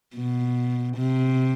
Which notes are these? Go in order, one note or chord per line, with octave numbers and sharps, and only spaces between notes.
B2
C3